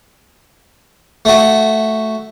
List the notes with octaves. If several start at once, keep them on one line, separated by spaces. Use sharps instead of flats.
A3 F#4